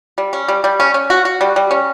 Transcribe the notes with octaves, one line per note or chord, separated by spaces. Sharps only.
G3
C#4
G3
G3
C#4
C#4
F#4
F#4
G3
G3
C#4